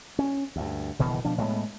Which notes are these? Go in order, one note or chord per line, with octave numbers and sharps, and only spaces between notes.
C#4
D2 G2
F#1 B2 D#3 E3
B2 F3 D4
A2 G3 G#3 B3